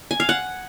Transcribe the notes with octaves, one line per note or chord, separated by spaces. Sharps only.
G#5
F5
F#5